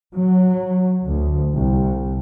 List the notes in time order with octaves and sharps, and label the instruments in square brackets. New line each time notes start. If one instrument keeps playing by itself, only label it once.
[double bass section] F#3
D2
C2